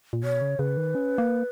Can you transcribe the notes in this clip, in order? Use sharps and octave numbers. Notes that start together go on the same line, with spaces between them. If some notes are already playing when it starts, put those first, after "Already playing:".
A#2
B2 C#5
C#3
C#3 B4
D#3
C#4
A#3